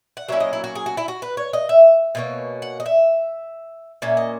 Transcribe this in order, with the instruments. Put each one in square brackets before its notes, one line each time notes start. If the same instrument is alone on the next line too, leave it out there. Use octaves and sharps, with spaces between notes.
[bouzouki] F#5
F#3 A#3 C#4 E4 E5
D#5
E4
F#4
G#4
F#4
E4
F#4
B4
C#5
D#5
E5
B2 A#3 C#4
F#5
D#5
E5
A#2 A#3 C#4 E5
D#5